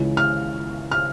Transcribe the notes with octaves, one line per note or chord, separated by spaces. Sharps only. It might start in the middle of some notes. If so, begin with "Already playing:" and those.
Already playing: C#2 C#3 E3
F6
F6